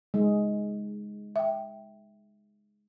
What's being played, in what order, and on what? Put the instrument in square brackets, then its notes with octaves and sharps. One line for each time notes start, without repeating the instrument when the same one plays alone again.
[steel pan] G#3
[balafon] E5 G5